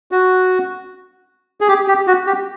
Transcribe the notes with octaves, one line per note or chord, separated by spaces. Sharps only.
F#4
G#4
G4
G4
F#4
G4